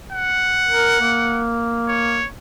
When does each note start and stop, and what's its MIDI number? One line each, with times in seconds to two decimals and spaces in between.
0.13 1.44 78
0.69 1.00 70
1.01 2.22 58
1.89 2.26 73